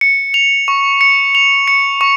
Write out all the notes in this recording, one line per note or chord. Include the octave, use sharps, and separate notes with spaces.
C#7
F7
C#6
C#7
F7
C#7
C#6